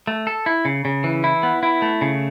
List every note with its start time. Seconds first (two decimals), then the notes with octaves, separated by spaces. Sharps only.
0.07 A3
0.27 A4
0.46 E4
0.65 C#3
0.85 C#3
1.04 E3
1.24 E4
1.43 B3
1.63 E4
1.82 A3
2.01 C#3